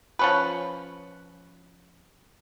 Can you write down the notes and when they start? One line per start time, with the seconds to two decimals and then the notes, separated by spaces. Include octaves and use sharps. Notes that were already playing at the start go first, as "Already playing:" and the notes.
0.19 F3 C#4 B4